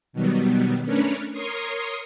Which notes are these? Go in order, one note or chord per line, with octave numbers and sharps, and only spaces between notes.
B2 D#3 F#3 G3 B3
A3 C#4 D4 A#4 B4 C#5
A#4 C#5 C6 C#6 D#6 C7